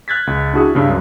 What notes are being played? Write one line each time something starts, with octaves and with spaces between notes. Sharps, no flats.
F6 F#6 G#6 A6 B6
C#2
D4 E4 F#4 G#4 E5
G2 C#3
C#2 F#2